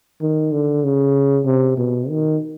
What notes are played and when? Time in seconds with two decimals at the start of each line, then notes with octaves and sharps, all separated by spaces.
0.22 D#3
0.52 D3
0.84 C#3
1.46 C3
1.78 B2
2.09 D#3